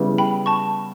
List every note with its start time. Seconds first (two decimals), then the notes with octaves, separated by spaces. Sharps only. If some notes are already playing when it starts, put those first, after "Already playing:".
Already playing: C#3 G3 B3 E4
0.18 G5 B5
0.46 A5 C#6